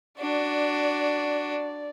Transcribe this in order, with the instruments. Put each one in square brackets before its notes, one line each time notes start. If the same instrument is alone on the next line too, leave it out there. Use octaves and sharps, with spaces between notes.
[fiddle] D4 F#4 [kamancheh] D5